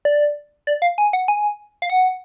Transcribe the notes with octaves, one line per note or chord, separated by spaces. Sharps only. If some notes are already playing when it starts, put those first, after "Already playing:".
D5
D5
F5
G#5
F#5
G#5
F5
F#5